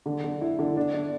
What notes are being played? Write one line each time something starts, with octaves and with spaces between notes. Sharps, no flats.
D3
D3
E4
D3
D4
D4